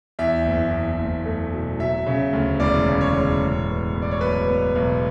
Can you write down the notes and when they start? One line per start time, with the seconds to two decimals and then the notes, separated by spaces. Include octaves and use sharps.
0.19 E2 E5
0.45 F#1
0.72 E2
0.99 F#1
1.25 A3
1.53 B2
1.79 F#3 E5
2.06 C#3
2.33 D2
2.60 E1 D5
2.87 C#3
3.01 C#5
3.13 E1
3.41 A2
3.67 B3
3.94 B3
4.02 D5
4.11 C#5
4.20 B1 B4
4.48 B3
4.75 B1